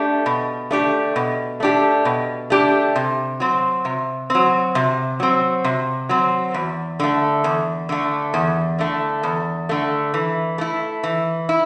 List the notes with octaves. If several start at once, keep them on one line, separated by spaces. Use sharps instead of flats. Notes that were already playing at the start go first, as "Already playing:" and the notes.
Already playing: A3 D4 G4
B2
A3 D4 G4
B2
A3 D4 G4
B2
A3 D4 G4
C3
F#3 C4
C3
F#3 C4
C3
F#3 C4
C3
F#3 C4
E2
D3 A3
E2
D3 A3
E2
D3 A3
E2
D3 A3
E3
A3 E4
E3
E4